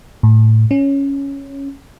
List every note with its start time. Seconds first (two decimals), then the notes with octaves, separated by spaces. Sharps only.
0.23 A2
0.71 C#4